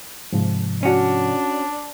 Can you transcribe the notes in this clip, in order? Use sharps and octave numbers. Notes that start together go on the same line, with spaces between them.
G#2 C3 F3
C#4 D4 F#4